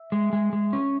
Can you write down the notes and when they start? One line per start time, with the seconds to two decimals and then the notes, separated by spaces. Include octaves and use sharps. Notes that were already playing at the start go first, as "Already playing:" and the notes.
Already playing: E5
0.12 G#3
0.33 G#3
0.53 G#3
0.73 C#4